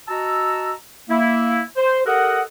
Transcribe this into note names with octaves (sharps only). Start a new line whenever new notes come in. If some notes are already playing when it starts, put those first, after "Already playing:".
F#4 D#5 A5 A#5 E6
A#3 E4
C5
G4 A4 A#4 D#5 F#5